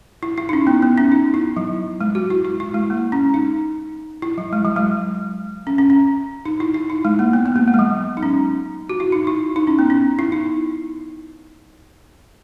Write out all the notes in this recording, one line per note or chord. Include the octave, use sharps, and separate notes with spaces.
E4
E4
D#4
C#4
B3
B3
C#4
D#4
E4
F#3
G#3
F#4
E4
E4
E4
G#3
A#3
C#4
D#4
E4
F#3
G#3
F#3
G#3
C#4
C#4
C#4
D#4
E4
E4
D#4
G#3
A#3
B3
B3
A#3
A#3
G#3
F#3
D#4
C#4
F#4
E4
D#4
E4
D#4
C#4
B3
C#4
E4
D#4